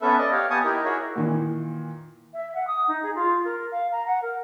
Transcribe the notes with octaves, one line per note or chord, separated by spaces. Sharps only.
B3 C#4 A4 B4 E5
D5 D#5
G4 C#5 F5
B3 G4 G#5 A5 C#6 D#6
D#4 E4 G4 A#4
E4 F#4 G#4 A#4 C#5
A#2 D#3 E3
E5
F#5
D#6
D#4
G#4
F4
A#4
F5
A#5
F#5
A#4